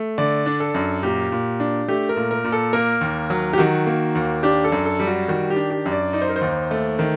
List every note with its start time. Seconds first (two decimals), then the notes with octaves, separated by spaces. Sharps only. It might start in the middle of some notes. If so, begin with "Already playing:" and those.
Already playing: A3
0.18 D3 D5
0.46 D4
0.60 A4
0.74 F#2
1.03 A#2 G4
1.32 A#2
1.60 D4
1.88 A3 G4
2.09 A#4
2.16 A#2
2.31 A#4
2.44 A#2
2.52 A4
2.73 A#3 A#4
3.01 D#2
3.30 F#3
3.53 G4
3.58 D#3 F#4
3.86 A#3
4.15 D#2
4.43 D4 G4
4.64 A4
4.72 F#2
4.85 A4
5.00 G3
5.07 F#4
5.28 D#3 F#4
5.50 G4
5.56 D4
5.71 G4
5.86 F#2
5.92 D5
6.13 D#4 D5
6.21 C5
6.29 A#4
6.36 C5
6.41 D#2
6.71 A3
6.99 D#3